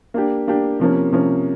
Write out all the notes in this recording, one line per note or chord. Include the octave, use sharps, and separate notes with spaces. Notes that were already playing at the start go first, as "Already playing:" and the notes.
A#3 D4 G4
A#3 D4 G4
C3 F3 A#3 C#4
C3 F3 A#3 C#4